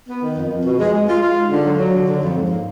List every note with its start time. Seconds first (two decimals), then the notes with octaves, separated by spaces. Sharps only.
0.08 B3
0.22 D#3
0.37 F2
0.51 F2
0.65 B2
0.79 G#3
0.93 G#3
1.08 F4
1.22 F4
1.36 G#2
1.50 D3
1.65 F#3
1.79 F#3
1.94 D3
2.07 D3
2.22 F2
2.37 G#2
2.50 A#3